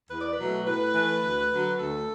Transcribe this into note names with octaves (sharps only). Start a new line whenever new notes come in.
E2 B4
D5
B4
B2 F#3 A3
A2 B4
E3 A3
D2
D3 F#3
D2 A4